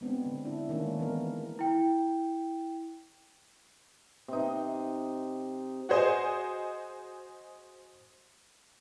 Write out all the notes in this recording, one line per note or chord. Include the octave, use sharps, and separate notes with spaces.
G#3 B3 C4 D4
D3
D4 E4
D#3 A3 A#3 C#4 D4
G#3
E3 B3 A#4
E4 G5
C3 D#4
F#4 G#4 C5 D#5 G#5